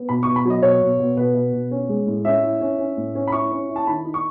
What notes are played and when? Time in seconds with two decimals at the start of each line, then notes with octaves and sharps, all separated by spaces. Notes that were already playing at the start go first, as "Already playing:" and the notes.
Already playing: B3
0.09 B2 B5
0.23 B2 C#6
0.36 B5
0.45 F#3 D#5
0.62 B2 C#5
0.81 B2
1.00 B2
1.17 B2 B4
1.35 B2
1.53 B2
1.71 C#4
1.89 G#3
2.07 A2
2.25 C#4 E5
2.43 E4
2.61 C#4
2.79 C#4
2.97 A2
3.15 C#4
3.27 B5
3.32 E4 C#6
3.51 C#4
3.69 E4
3.76 A5
3.87 D#3 B5
4.05 D#4
4.14 C#6